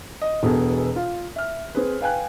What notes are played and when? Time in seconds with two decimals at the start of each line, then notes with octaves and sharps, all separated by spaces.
0.22 D#5
0.43 E1 B2 B3 G#4 A4
0.96 F4
1.36 E5 F6
1.75 C4 G#4 B4
2.01 B4 F5 G5 G#5 F#6